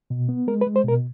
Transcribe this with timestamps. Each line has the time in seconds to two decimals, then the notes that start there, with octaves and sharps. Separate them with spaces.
0.10 B2
0.29 B3
0.47 G#3 A#4
0.61 B4
0.66 G#3
0.76 C5
0.84 B2 A#4